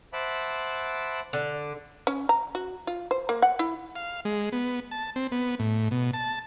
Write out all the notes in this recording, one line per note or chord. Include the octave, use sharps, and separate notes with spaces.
C5 E5 F#5 A5 B5 D6
D3
C#4
A#5
F#4
F4
C5
A#3
F#5
E4
F5
G#3
B3
A5
C4
B3
A2
B2
A5